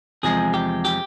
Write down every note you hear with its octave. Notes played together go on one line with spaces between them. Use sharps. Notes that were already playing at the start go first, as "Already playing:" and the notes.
E2 C3 F3 G#3 G#4
G4
G4